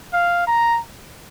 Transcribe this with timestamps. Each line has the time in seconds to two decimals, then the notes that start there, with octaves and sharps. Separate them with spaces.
0.13 F5
0.47 A#5